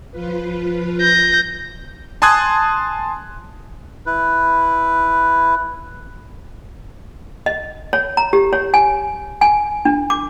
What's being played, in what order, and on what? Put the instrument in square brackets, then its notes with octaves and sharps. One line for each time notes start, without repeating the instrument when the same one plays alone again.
[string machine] F3 F4 B4
[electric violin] G6 A#6
[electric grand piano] G#5 A5 C6 D#6 F#6 G#6
[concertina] E4 B4
[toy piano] D#5
C#5
A#5
G4
C#5
G#5
G#5
D4
D6